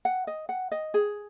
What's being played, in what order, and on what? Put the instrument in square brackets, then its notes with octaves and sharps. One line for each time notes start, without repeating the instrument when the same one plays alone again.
[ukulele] F#5
D#5
F#5
D#5
G#4